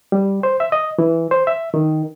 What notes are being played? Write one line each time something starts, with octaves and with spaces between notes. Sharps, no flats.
G3
C5
E5
D#5
E3
C5
E5
D#3